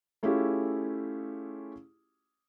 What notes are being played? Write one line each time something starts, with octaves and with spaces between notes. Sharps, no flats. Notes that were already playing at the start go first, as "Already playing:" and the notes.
A3 C#4 E4 F4 G4 G#4